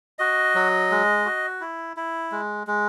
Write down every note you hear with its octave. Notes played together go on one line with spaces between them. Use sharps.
F#4 D#5
F#3
G#3
F#4
E4
E4
G#3
G#3